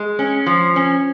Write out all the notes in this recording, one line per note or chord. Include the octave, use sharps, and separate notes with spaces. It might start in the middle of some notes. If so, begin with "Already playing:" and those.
Already playing: G#3
C#4
F3
C#4